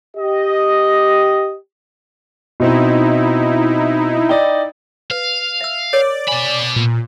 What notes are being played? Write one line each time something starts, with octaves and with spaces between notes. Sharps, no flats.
G4 D#5
B2 C4 D#4 E4
D5 D#5 G5
B4 F5
E5 E6
A#4 C#5 D5
B2 G#5 B5
A#2